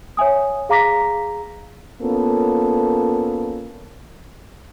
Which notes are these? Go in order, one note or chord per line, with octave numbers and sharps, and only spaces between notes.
C#5 E5 G#5 D#6
G#4 F5 A#5 D6 A#6 B6
A#3 B3 C#4 F4 A4